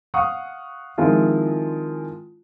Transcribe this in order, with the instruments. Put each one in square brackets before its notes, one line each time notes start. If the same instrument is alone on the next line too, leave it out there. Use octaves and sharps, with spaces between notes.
[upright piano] F5 F#5 C#6 D#6
D#3 F3 G#3 C4 E4 F4